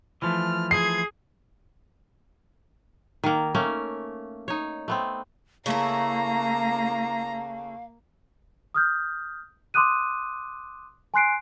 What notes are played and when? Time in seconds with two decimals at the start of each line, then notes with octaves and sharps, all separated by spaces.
0.22 E3 F3 A3 F6
0.71 G#4 G#6 C7
3.24 D#3 A#3
3.55 A3 A#3 C#4
4.48 D#4 C#5
4.88 A3 B3 C4
5.66 C#3 A3 A#3 E4 F5 A#5
8.74 D#6 F6 G6
9.74 C6 D6 D#6 F#6 D#7
11.14 G#5 C6 F#6 C7 D7